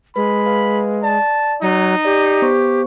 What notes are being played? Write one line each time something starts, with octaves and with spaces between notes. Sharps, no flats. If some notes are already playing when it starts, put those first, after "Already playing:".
G#3 B4 B5
B4 F5
D5 A5
F#3 D#4
G4 D5
B3 C5 C#6